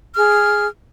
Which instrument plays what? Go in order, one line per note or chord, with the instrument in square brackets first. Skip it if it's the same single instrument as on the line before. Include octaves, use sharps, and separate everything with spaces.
[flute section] G#4 F6